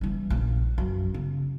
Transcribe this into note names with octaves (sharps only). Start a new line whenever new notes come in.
E3 G3
A#1
F#2
C#3